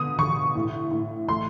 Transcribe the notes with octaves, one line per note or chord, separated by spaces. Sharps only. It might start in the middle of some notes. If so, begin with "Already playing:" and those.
Already playing: B2 D3 D#6
D3 C#6
A2
A2
A3 C6